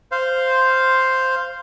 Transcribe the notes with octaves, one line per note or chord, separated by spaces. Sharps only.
C5 F5